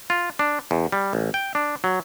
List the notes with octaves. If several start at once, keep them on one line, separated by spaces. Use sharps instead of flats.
F4
D4
E2
G3
A1
G5
D4
F#3